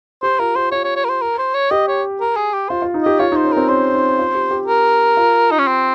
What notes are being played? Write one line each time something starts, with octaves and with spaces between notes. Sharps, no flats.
G4 C5
F4 A#4
G4 C5
F4 C#5
C#5
C#5
A#4
C5
A#4
C5
C#5
G4 D#5
C#5
A#4
G#4
G4
F4 C5
F4
D#4
G4 D#5
F4 C#5
D#4
C5
C#4
C4 A#4
C#4 C5
D#4
F4
G4
G4
A#4
F4
D#4
C#4
C4